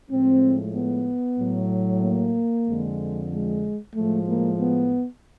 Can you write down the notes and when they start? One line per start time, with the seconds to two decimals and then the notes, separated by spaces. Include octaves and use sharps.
0.10 A2 F3 G#3 C4
0.75 B3
1.39 A2 F#3
2.02 A#3
2.67 F2 D3 F3 G#3
3.32 G#3
3.95 A2 F3 G#3 A3
4.27 A#3
4.59 B3